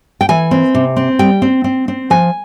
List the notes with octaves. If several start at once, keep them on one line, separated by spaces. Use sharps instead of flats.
G5
E3 G#5
C4
C3
C4
G3 G5
C4
C4
C4
F3 G#5